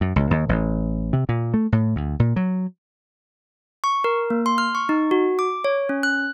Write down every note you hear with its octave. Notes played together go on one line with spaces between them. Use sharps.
F#2
C#2
D#2
A1
C3
A#2
A3
A2
D2
A#2
F#3
C#6
A#4
A#3
C6
F6
C#6
D#4
F#4
D6
C#5
C#4
F#6